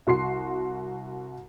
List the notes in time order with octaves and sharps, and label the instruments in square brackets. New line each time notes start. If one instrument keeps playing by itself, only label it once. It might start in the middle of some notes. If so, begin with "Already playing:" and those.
[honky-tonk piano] C2 F#4 C6 C7